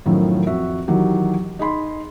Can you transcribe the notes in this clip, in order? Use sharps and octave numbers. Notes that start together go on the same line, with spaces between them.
F#2 A2 D#3 F3 F#3
F2 F#4 E5
D#3 E3 F#3 G4
D#4 G#4 B5 C6